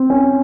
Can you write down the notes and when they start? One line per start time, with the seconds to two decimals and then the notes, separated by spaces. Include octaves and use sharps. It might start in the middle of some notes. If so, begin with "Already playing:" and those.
Already playing: C4
0.10 C#4